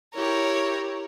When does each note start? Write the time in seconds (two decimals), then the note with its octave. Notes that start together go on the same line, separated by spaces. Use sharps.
0.15 E4 G4 A#4 C#5